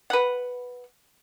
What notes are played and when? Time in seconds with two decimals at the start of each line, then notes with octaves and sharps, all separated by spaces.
0.10 B4 F#5